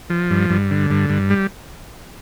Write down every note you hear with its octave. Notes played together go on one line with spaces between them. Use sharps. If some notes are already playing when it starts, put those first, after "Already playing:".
F3
G2
G2
D3
G2
G2
G3